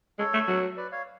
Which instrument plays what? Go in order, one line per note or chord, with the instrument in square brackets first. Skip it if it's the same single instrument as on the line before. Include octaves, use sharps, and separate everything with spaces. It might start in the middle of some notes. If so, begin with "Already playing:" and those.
[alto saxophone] G#3 [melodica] A4 C#5
[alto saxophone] A3
F#3
[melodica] B4 D5
C#5 F5